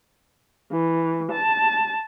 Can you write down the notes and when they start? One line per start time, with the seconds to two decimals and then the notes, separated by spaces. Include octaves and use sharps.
0.71 E3
1.31 A5